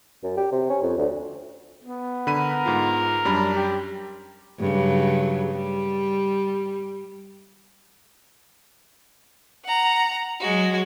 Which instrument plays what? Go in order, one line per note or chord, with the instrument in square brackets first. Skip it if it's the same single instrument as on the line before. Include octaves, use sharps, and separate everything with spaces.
[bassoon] F#2
G4
C3
C#4
F2
D2
[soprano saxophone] B3
[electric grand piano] D3 B5 D#7 [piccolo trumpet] A#4
[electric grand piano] G#2 F4
[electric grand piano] F#2 G3 B5 [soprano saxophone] D4
[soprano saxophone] G4
[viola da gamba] G2 C#3 F#3
G3
[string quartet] F#5 A#5
F#3 G#3 F#4